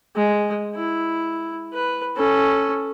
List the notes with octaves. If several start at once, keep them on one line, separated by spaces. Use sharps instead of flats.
G#3
E4
B4
C#4 A4